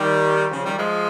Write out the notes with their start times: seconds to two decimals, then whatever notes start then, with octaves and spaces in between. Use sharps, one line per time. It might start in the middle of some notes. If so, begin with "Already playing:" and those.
Already playing: D#3 G3
0.51 C#3 F3
0.65 D#3 G3
0.78 F3 G#3